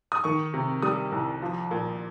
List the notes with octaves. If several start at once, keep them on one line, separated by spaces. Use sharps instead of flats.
D#6
D#3 C#6
C3
G3 D#6
C2
F3
A#2